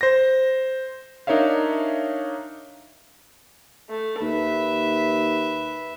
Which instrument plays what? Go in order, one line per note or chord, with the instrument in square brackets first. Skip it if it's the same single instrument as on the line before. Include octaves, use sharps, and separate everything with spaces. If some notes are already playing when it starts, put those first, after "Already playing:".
[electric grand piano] C5 A#6
D4 D#4 A#4 C#5 E5 F5
[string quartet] A3
[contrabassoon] D#2 [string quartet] B4 E5